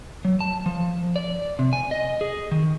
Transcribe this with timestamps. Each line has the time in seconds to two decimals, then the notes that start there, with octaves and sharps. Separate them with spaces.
0.25 F#3
0.41 A5
0.66 F3
1.16 D5
1.59 C3
1.73 G#5
1.91 D#5
2.21 G#4
2.51 D#3